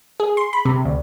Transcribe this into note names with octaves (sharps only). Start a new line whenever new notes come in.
G#4
C6
B5
C3
D2